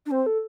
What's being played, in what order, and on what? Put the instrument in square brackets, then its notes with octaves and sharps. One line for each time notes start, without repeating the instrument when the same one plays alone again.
[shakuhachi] D4
[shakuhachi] C4 [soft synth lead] C5
[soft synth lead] A4